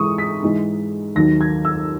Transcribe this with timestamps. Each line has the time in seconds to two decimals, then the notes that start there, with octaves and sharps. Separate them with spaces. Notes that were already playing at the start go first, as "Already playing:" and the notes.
Already playing: G#2 E3 G#3 C#6 D#6
0.18 B6
0.43 G#2 E3 G#3
1.15 D#2 D#3 F#3 A#6
1.41 G#6
1.65 E6